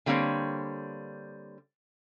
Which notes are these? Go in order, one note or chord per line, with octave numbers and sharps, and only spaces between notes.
D3 G3 A#3 C4 C#5